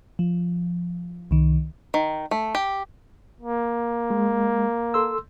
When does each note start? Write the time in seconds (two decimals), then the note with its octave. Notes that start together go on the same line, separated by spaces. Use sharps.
0.19 F3
1.31 C2 D#3
1.94 D#3
2.31 A3
2.55 G4
3.41 A#3
4.10 G#3
4.94 A4 C6 E6